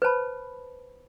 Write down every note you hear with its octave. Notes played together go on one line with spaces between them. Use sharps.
B4 C5 A5 B5